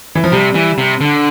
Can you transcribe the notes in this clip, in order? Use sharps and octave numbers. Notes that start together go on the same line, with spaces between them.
E3
F3
C3 G3
E3
C3
D3